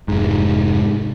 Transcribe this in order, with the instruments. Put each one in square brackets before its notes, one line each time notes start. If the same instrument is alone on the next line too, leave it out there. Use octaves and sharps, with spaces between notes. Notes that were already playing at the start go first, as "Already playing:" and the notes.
[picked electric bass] F1 G#2